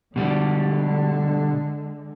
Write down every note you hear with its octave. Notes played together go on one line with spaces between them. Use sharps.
B2 D3 G3 G#3